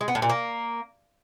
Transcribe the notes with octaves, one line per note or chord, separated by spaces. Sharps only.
G#3
B3
A2
A#2
A#3